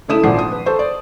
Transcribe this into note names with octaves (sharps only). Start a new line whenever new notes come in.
C#3 A3 E4 D#6 E7
G#1 A#2 F3 F#5 D6 C7
D#6
B4
A4 C5 C#6
D5